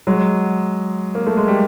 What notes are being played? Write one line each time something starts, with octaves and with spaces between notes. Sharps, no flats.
F#3 G#3
A#3
A3
G#3
G3